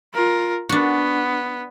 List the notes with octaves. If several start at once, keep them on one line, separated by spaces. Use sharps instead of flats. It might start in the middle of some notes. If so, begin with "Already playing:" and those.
F4 A#4
B3 D4 F#4